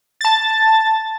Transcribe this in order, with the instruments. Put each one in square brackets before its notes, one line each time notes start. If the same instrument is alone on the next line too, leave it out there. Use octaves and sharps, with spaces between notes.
[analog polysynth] A5 A6